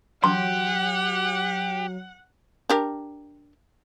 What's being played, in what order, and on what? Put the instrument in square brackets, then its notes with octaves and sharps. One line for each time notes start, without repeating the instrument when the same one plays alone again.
[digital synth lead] F#3 [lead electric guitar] G4 [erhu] F#5 [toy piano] C6
[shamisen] D4 G4 A#4